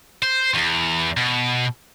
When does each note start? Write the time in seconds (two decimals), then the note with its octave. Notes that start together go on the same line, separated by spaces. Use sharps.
0.23 C5
0.54 E2
1.17 B2